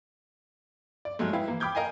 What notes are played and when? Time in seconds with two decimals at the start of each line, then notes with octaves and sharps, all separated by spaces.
1.05 D5
1.19 G#2 F#3 G#3 A3
1.33 E4 B4 E5 F5 G5
1.48 E3 A#3
1.60 G5 B5 D6 F6 G6 G#6
1.75 A#4 D#5 F5 G5 G#5